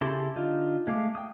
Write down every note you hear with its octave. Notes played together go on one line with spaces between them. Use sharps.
C#3 E4 G4 A4 C6
D3 D#4 F4
G#3 A3 F5 D6
G5 D#6